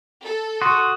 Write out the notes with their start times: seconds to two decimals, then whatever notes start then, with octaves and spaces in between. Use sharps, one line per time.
0.23 A4
0.62 F#4 C6 C#6 D#6